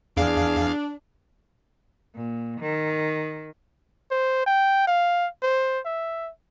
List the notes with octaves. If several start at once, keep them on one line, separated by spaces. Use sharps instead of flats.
E2 D4 G#4 F5
A#2
D#3
C5
G5
F5
C5
E5